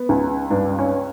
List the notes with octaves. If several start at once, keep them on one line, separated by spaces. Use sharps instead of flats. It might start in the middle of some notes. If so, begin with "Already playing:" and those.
Already playing: B3
C#2
G2 D4
C#4